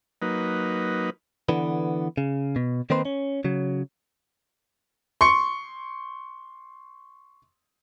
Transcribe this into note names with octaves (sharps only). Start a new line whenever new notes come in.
F#3 A#3 D#4 B4
D3 E3 B3
C#3
B2
D#3 A#3 C4 D#4 B4 C5
C#4
C#3 F#3
C6 C#6 C#7